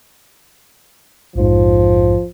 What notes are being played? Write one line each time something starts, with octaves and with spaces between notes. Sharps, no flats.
A#1 F2 G#2 F3